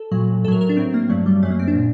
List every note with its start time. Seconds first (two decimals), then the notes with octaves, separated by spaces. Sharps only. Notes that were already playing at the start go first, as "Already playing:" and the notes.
Already playing: A4
0.12 A#2 F#3
0.44 A2 A4
0.48 F#3 A#4
0.61 A#4
0.69 D4
0.77 A2 F#3 C4
0.94 A#3
1.10 G2 F#3 A3
1.26 G3
1.43 F#2 F#3 A3
1.51 A#3
1.59 C4
1.68 D4
1.75 A#2